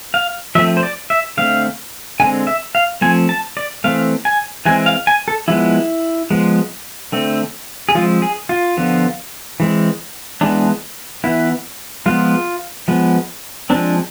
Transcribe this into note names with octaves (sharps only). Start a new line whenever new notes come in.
F5
F3 A3 C4 E5
C5
D5
E5
D3 A3 C4 F5
D3 G#3 C4 G#5
E5
F5
F3 A3 C4 G#5
A5
D5
E3 A3 C4 F5
G#5
E3 G#3 C4 G#5
F5
G#5
A4
F3 G#3 B3 E4
F3 G#3 B3
D3 A3 C4
G#4
F3 G#3 C4 F4
G#4
F4
D3 F3 B3
E3 G#3 C4
E3 G#3 B3 D4
E3 B3 E4
F3 G#3 B3 F4
F3 G#3 B3
F3 G#3 C4 D4